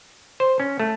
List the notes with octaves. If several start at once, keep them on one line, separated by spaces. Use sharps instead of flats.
C5
C#4
A3